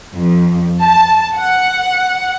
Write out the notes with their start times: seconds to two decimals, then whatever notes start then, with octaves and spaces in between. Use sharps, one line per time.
0.14 F2
0.80 A5
1.37 F#5